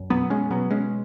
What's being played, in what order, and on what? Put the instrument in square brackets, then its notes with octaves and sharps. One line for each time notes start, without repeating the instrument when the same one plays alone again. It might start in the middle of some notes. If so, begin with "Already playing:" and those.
Already playing: [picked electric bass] F#2
B2 F#3 B3
G#3 C#4
B2 F#3 B3
G#3 C#4